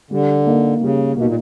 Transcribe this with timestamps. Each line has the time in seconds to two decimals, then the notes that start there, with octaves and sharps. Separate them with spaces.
0.11 D3 G3
0.46 A#3 D#4
0.81 C#3 G3
1.16 B2 A#3 D#4
1.26 A#2